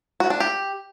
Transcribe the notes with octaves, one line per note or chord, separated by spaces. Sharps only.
F#4
D4
G4